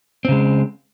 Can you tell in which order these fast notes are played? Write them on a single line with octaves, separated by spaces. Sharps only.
C4 C#3 G#3